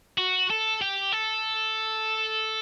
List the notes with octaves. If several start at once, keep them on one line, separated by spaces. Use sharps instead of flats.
F#4
A4
G4
A4